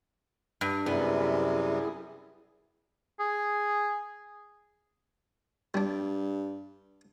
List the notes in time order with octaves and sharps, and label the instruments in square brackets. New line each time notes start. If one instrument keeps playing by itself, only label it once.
[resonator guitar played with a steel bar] G2
[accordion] F#2 C3 G3 [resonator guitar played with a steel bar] B3 [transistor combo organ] E4 G#4
[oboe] G#4
[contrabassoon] G2 [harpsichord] G3 D4